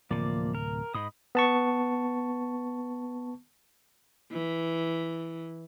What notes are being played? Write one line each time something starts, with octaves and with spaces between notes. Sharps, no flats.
D1 C3 F3 A#3 D5
A#4
G#2 D#5 B5 D#6
B3 A5 C#6
E3